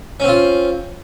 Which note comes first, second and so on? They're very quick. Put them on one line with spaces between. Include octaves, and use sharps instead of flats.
C#4 C4 F4